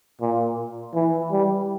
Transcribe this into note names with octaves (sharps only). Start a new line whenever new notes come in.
A#2
E3
G3